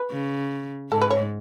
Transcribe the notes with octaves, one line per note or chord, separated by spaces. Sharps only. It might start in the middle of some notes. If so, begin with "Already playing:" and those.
Already playing: B4
C#3
G#2 A4
B4
C#5